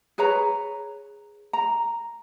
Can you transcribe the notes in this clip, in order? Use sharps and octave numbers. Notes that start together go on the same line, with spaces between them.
G#4 B4 C#5 A#5
A#5